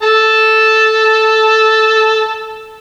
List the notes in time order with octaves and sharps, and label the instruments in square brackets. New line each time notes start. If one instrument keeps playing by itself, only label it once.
[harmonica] A4 A5